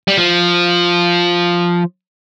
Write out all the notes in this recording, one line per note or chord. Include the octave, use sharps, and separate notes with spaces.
G3
F3